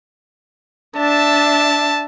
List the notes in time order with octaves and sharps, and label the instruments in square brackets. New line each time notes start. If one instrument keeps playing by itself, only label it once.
[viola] D4 E5 [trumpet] A5